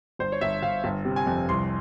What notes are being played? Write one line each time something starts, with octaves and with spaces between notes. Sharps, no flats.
G1 C5
C#5
G1 E5
G1 F5
G1
C3
G#5
F2
C2 C6